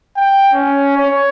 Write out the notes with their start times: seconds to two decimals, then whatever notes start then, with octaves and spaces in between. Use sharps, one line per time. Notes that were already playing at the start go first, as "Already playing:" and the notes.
0.16 G5
0.53 C#4
0.98 C#5